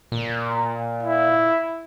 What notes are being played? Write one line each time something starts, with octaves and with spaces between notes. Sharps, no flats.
A#2
E4